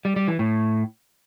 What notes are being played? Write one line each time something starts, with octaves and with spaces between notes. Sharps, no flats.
G3
G3
E3
A2